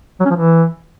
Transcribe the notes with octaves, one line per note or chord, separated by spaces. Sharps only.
F#3
C#4
F3
E3